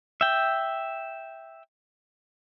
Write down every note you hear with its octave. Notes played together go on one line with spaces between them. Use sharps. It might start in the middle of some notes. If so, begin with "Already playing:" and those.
E5 G5